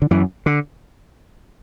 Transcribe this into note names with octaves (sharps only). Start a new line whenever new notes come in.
D3
F#2 E3
D3